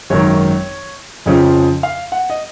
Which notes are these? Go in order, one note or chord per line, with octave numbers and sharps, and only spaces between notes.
G#1 F#2 D#3 C#5
F2 C#3 F3 D#5
F5
F#5
D#5